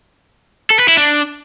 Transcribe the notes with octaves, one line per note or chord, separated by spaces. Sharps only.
A4
B4
E4
D4